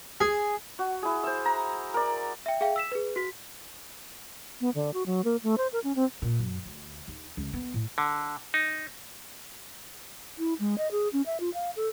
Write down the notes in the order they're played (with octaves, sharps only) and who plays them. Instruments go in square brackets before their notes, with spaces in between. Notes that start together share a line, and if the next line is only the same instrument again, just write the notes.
[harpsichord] G#4
[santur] F#4
E4 G#4
C5 E5
A#5
A#4 D5
[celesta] E5 G5
G#4 E5 F5 G5
E6 B6 E7
G#4 B4
F#4 B6
[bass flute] B3
D3
F#4
F#3
A#3
A3
C5
A#4
C#4
C4
[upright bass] A#2
F#2
D2
D#2
C#2
B3
A2
[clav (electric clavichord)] D3
D#4
[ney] E4
G#3
D#5
G#4
C#4
E5
F4
F5
A4